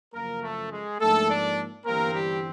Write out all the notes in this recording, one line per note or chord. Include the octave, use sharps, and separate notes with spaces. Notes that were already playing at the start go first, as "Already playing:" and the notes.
F#2 C#3 F3 A#3 A#4
A3 A4
G#3 G#4
G#2 F3 A3 A#3 D4 A4
D4 D5
G1 G2 E3 G3 A#3 C4 A#4
G3 G4